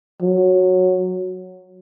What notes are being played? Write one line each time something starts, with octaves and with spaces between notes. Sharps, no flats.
F#3